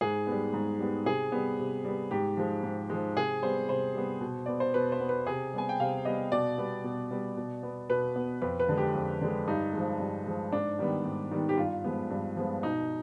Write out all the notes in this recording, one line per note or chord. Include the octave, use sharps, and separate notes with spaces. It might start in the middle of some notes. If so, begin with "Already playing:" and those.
G#2 G#4
G3 B3
G#2
G3 B3
C3 G#4
G3 B3
C3
G3 B3
G#2 G4
F3 G#3
G#2
F3 G#3
C3 G#4
G3 B3 C5
C3 C5
G3 B3
B2
B3 D5
C5
B2 B4
C5
B3
B4
C3 G#4
G3 B3 G#5
G5
C3 F5
G3 B3 D#5
B2 D5
G3 B3
B2
G3 B3
B2
B3
B2 B4
B3
F2 B4
B4
D3 G#3
G4
F2
D3 G#3
G2 D#4
F3 G#3
G2
F3 G#3
G#2 D4
D#3 G3 B3
G#2
D#3 G3 B3
G4
G2 F4
F3 G#3 B3
G2
F3 G#3 B3
B2 D#4